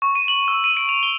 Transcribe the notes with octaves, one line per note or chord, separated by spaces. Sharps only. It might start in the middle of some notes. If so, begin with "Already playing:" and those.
C#6
D#7
F#7
E6
D#7
D7
F7
G7